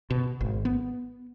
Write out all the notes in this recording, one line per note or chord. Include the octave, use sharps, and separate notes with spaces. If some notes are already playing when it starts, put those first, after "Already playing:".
B2
G#1
B3